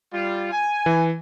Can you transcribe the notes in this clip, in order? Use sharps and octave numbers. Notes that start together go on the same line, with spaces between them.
G3 F4
G#5
E3